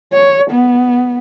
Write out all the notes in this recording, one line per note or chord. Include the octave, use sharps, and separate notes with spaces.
C#5
B3